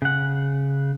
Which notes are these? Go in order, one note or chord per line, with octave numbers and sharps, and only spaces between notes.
C#3 F#5